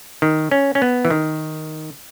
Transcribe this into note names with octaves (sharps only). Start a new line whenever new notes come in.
D#3
C#4
C#4
B3
E3
D#3